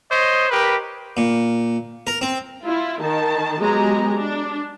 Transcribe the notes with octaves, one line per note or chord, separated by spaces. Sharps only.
C5 C#5 D#5
G4 A#4 B4
A#2
A#4
C4
E4 F4
D#3 A5
F#3 G#3 B3 G4 A#5
D4